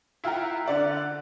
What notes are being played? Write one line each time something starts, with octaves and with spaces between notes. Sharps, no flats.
E4 F4 F#5 G5 A#5
D3 D5 F#5